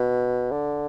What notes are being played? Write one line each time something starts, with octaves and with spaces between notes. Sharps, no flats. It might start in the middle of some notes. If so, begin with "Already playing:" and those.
Already playing: B2
D3